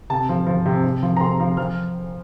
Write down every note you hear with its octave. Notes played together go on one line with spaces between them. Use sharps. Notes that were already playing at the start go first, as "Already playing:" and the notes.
C3 A5
F3
F3
C3
C3
F3
A#5
C3 C6
F3
F3 F6